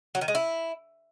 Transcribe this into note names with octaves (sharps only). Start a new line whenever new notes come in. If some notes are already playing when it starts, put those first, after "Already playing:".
F#3
D#3
G#3
E4